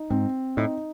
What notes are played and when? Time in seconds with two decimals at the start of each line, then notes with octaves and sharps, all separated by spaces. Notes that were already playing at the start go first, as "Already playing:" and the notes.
Already playing: D#4
0.10 G#2 C4
0.57 A2 D#4